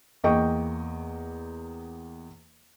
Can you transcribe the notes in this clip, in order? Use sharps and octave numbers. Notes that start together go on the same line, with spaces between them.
E2 A#3 D#5 G5 C#6